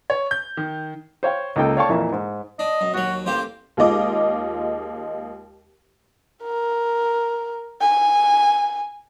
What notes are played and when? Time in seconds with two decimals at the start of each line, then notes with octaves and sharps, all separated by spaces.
0.10 C#5
0.31 G6
0.57 D#3
1.23 C5 C#5 F5 G5
1.56 C#2 A#3 D#4 A4 G5
1.77 C#5 D5 F5 G5 A5 C#6
1.89 F2 A#2 E3 A#4 E5
2.12 G#2
2.59 D4 D#5
2.81 F#2
2.94 D#2 F#3 F#4
3.26 A1 A#3 G4 C5
3.77 D#2 G#3 F4 D#5 D6
6.43 A#4
7.81 G#5